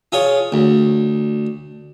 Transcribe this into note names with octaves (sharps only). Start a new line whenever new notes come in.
F4 G#4 C#5
D2